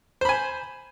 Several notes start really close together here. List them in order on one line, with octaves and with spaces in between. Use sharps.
C5 B5 G#5